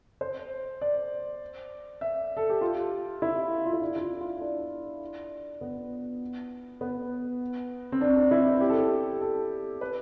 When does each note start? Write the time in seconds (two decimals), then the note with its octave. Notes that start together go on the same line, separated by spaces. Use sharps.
0.21 C5
0.81 D5
2.01 E5
2.37 A4
2.50 G4
2.61 F4
3.22 E4
3.66 F4
3.73 E4
3.81 D4
3.96 E4
4.01 F4
4.21 F4
4.41 D4
5.61 B3
6.81 B3
7.92 C4
8.01 D4
8.16 D4
8.31 E4
8.61 G4
8.69 A4
8.78 G4
9.21 A4
9.81 B4